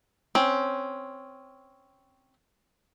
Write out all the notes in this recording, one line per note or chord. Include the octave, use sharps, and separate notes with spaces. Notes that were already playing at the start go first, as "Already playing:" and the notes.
C4 C#4